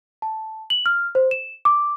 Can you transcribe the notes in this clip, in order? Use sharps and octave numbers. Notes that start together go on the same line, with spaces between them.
A5
F#7
F6
C5
E7
D6